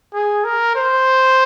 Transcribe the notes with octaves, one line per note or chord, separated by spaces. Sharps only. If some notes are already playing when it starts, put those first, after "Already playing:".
G#4
A#4
C5